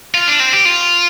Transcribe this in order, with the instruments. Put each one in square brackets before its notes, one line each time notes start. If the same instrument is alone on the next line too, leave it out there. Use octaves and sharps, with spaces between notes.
[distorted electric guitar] F4
D4
C4
G4
F4